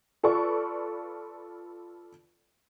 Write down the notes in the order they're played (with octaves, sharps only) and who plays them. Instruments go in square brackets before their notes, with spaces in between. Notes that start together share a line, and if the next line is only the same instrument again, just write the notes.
[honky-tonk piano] F4 A4 B4 D5 C#6